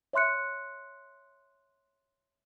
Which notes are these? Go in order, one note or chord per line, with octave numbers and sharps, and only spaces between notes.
C#5 E5 C6 F#6 C#7